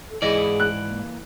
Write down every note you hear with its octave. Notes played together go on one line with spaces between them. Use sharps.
A4
G#2 E3 E4 G#4 D5 D#5
F#6
A#3